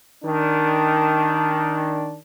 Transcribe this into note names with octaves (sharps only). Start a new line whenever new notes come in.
D#3 D4